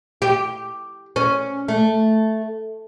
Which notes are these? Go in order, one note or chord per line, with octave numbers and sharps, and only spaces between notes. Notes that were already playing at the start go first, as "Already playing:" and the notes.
G4
C#4
A3